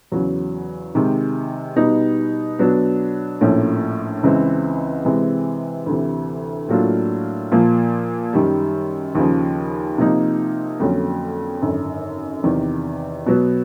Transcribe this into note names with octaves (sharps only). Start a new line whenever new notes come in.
E2 C#3 F#3
C3 D#3 G#3
B2 G3 B3 D#4
B2 F#3 B3 D4
A#1 A2 F3 A#3 C#4
C#2 C#3 E3 G#3 C4
C3 E3 G#3 C4
D2 C3 E3
A2 F#3 A#3 D4 F4
A#2 F3 A#3
F#2 D#3 G3
D#2 C#3 F3
C3 F3 A#3 D#4
F2 D3 F#3 A#3 C#4
G#1 F#2 D3
E2 C3 D#3
B2 F#3 B3